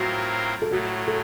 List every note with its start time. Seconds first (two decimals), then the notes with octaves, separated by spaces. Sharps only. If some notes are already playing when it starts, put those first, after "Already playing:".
Already playing: A2 F#3 C4 F4 F#4 A#4
0.62 A4
0.71 A2 F#3 A3 F#4
1.08 A4